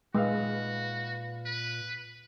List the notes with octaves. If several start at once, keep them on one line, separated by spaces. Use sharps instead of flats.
A#2 G#3 F#4 B4 F5
B4